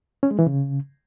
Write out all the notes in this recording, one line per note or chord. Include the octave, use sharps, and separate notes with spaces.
C#4
G#3
E3
C#3